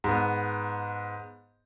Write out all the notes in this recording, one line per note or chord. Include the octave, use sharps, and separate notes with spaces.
G#2 B3